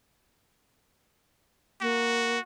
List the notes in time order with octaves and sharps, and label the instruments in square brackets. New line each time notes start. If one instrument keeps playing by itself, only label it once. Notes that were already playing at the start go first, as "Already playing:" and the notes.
[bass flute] A#3 [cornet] F#4